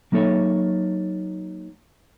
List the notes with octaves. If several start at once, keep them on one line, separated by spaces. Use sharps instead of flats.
F#3 A#3 D#4 A4 C#5 E5